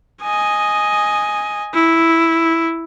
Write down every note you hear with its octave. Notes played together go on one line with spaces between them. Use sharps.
D#5 G#5
E4